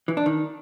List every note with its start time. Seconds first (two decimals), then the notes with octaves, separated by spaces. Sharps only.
0.08 E3
0.17 D4
0.26 D#3